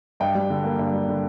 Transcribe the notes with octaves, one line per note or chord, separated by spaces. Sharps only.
G2 D#5 G5
G3
D3
A#3
G2
G3
D3